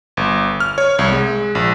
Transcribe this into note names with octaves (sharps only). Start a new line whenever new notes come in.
G1
F6
C#5
C2
G#3
A#1